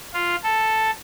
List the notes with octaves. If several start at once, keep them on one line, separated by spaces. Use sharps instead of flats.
F4
A4